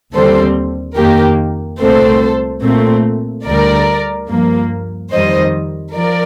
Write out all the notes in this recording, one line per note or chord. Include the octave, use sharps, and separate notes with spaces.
D#2 D3 G3 C4 A4 C5
F2 D#3 A#3 G4 A#4
C2 A#2 A3 C4 A4 C5
A#2 A3 C4
D2 D3 G3 A#4 D5
G2 F3 A#3
F2 D#3 G3 C5 D#5
F3 A#4 D5